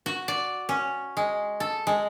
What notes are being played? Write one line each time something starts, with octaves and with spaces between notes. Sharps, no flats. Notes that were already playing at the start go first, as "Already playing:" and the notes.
F#4
D5
C#4
G#3
A4
G#3